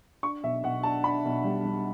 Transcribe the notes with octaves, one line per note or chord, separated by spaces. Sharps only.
D4 C#6
B1 E5
B1 F#5
D4 A5
D4 B5
B1
G3
G3